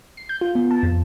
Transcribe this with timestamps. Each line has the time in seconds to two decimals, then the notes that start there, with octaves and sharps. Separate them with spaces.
0.17 C7
0.29 G6
0.41 F4
0.55 B3
0.71 A5
0.83 F2